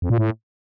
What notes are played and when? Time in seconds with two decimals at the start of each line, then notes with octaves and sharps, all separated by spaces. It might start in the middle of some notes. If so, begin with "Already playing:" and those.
0.02 F2
0.10 A#2
0.18 A2